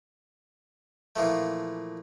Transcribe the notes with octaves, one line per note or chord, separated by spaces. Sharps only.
A#2 E3 F3 A3